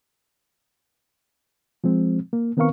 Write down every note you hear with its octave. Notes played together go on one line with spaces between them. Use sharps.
F3 G#3 C4
A#3
D#3 B3 C4 A#4 F5 C#6